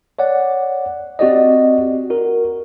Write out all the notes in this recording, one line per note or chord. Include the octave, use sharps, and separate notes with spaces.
C#5 D5 F#5
C4 F#4 G4 D5 D#5
F#4 A#4